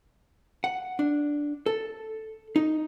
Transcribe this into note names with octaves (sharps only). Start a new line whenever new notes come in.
F#5
D4
A4
D#4